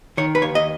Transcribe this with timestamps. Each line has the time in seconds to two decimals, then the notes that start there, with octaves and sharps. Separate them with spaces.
0.17 D#3 C#5
0.35 B4
0.42 D#2 C#5
0.55 D#5